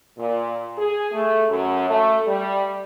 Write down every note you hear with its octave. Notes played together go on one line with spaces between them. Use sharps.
A#2
G#4
A3
F#2
A3
G3